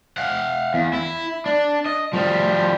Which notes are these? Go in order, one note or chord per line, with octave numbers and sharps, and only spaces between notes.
F5 F#5
E2
E4
D4
D#5
F3 G3